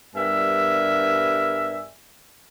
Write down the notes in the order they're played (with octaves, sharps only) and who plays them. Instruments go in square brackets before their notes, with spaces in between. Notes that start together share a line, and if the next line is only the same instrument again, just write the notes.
[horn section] G2 G3 B3 A#4 E5 G#5